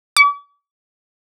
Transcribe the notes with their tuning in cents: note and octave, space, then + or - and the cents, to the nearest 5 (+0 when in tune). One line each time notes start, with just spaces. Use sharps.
D6 -45